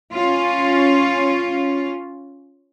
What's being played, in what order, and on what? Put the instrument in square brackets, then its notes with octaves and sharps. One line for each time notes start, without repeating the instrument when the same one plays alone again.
[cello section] C#4 F4